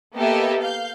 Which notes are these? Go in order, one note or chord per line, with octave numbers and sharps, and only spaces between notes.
A#3 B3 G4 A4 D#5 E5
F5 G6